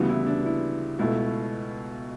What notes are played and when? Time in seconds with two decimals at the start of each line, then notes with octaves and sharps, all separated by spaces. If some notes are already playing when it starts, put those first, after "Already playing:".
Already playing: D2 C#3 E3 G3 B3
0.09 E4
0.27 D4
0.46 E4
0.99 C#2 B2 A3 E4